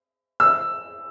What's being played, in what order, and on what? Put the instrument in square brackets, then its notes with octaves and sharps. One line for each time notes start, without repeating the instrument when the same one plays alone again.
[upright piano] E6